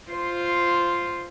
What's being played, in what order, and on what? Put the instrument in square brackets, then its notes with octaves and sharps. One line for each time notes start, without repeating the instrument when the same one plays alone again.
[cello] F4 C5